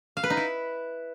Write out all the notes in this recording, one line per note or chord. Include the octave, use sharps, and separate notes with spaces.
F5
B4
D#4
E4